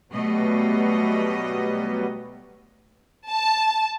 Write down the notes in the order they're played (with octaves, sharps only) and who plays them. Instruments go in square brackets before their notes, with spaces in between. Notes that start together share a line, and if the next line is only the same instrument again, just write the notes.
[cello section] B2 A3 D#5 [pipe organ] F#3 G3 B3
[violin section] A5